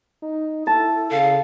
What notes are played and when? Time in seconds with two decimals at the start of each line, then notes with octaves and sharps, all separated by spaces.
0.23 D#4
0.67 E4 A4 A5
1.12 C#3 F5